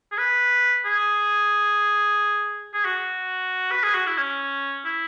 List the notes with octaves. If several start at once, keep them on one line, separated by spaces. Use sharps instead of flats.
G#4
B4
G#4
G#4
F#4
B4
G#4
F#4
E4
C#4
E4